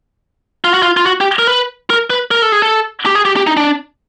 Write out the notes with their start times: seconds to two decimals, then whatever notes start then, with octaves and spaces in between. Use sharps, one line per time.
0.64 F4
0.74 F#4
0.82 F4
0.97 F4
1.06 F#4
1.21 G4
1.39 A#4
1.47 B4
1.90 A#4
2.10 B4
2.31 A#4
2.42 A4
2.52 G#4
2.62 A4
3.06 G4
3.15 G#4
3.25 G4
3.36 G4
3.47 D#4
3.57 D4